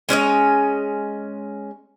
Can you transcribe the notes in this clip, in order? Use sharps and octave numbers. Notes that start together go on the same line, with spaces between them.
G#3 C#4 C#5 D#5